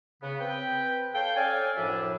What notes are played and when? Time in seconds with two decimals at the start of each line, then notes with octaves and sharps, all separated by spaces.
0.23 C#3 B3
0.41 C4 B4 G5
1.15 A4 C#5 F5 G5
1.36 C#4 A4 D5 F5 G#5
1.77 F#2 A2 F3 D4 E5